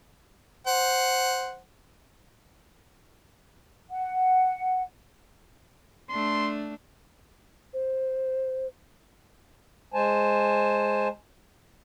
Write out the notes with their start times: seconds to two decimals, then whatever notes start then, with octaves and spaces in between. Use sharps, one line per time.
0.67 C5 F#5
3.90 F#5
6.10 A3 D4 C6
7.73 C5
9.94 G#3 C5 G#5 A5